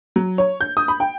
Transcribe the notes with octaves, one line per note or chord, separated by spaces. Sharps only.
F#3
C#5
G6
D#6
B5
G5